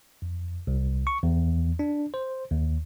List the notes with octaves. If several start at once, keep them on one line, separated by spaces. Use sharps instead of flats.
F2
C2
C#6
E2
D4
C5
D#2